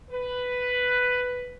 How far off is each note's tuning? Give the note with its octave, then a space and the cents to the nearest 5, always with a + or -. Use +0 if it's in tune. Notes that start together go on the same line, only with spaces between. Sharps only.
B4 +5